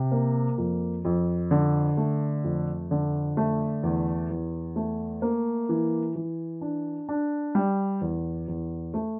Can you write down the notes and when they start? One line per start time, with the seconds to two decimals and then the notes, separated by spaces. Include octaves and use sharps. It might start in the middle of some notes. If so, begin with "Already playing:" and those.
Already playing: C3
0.12 A#3
0.58 F2
1.05 F2
1.51 D3
1.97 A3
2.44 F2
2.91 D3
3.37 A3
3.83 E2
4.30 E2
4.76 A3
5.22 A#3
5.69 E3
6.16 E3
6.61 D4
7.09 D4
7.55 G3
8.01 E2
8.48 E2
8.94 A3